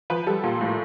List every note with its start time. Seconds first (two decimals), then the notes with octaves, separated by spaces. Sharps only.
0.10 F3 B4
0.27 G3 A4
0.44 A#2
0.61 A2